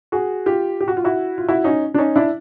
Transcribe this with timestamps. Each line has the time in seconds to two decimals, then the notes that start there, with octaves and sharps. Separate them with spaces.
0.12 F#4 G#4
0.46 F4 G4
0.80 G4
0.88 F#4
0.97 F4
1.04 E4 F#4
1.38 F4
1.48 E4 F#4
1.64 C#4 D#4
1.94 D4
1.98 C#4 D#4
2.16 D4 E4